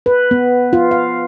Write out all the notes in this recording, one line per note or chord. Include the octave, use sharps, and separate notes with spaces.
B4
B3
F4
F5